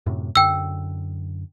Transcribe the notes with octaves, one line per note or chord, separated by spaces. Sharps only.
F#2 A2 C3
F#2 D3 G5 E6